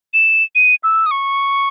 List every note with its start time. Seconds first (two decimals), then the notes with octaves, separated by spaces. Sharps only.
0.14 E7
0.55 D#7
0.84 E6
1.06 D#6
1.11 C#6